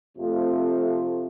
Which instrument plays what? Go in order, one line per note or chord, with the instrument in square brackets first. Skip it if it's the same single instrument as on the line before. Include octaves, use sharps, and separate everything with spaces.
[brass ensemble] F2 C3 F3 A3